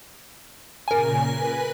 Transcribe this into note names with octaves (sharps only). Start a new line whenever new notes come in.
A#2 C#3 A#4 G#5
B4